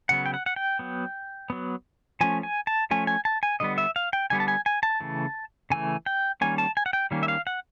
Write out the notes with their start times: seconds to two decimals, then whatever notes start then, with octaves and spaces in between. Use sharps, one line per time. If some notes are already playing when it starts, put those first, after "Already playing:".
0.09 C#3 F#3 B3 F#5
0.26 G5
0.34 F#5
0.46 F#5
0.56 G5
0.79 F#3 B3
1.50 F#3 B3
2.21 F3 A3 C#4 G#5
2.43 G#5
2.67 A5
2.91 F3 A3 C#4 G#5
3.07 G#5
3.25 A5
3.43 G#5
3.60 D3 G3 B3 D#5
3.78 E5
3.96 F5
4.13 G5
4.30 D3 G3 B3 G#5
4.40 A5
4.48 G#5
4.66 G#5
4.83 A5
5.00 C#3 E3 A3
5.70 C#3 E3 A3 G#5
6.06 G5
6.41 D#3 G3 A#3 C#4 G#5
6.58 A5
6.77 G#5
6.86 F#5
6.93 G5
7.11 D#3 G3 A#3 C#4
7.23 E5
7.28 F5
7.47 F#5